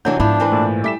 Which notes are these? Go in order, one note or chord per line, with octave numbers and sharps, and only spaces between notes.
C3 E3 F#3 D4 G6
G#2 F3 B3 D4 E4
E3 C4 B4
A#2 A3
G3 A3 D6 B6 E7